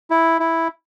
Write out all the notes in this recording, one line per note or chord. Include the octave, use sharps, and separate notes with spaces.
E4
E4